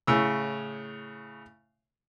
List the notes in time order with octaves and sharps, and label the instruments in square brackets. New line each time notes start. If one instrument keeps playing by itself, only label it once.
[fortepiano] A2 C#3 E6